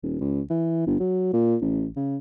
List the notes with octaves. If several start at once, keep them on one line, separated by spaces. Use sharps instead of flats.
D#1
C#2
E3
G1
F#3
A#2
A1
C#3